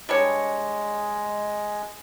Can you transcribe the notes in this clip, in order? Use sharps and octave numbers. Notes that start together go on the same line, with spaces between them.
G3 G#3 D4 C#5